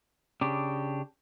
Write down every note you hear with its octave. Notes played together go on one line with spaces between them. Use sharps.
C#3 D4 G4